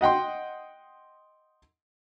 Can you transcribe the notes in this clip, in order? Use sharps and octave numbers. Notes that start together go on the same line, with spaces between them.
D#5 F#5 G5 C6